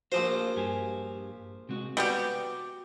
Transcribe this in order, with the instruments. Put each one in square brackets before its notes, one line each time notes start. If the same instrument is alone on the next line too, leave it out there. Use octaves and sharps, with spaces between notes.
[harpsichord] A#1 F3 C5 [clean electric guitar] F#4 F5
[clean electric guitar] G2 G4 G#5
C3 G#3 F#4
[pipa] G3 B3 G4 [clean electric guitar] F#4 D5